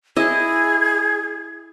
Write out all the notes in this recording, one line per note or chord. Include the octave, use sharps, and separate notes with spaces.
E4 G#4 D#5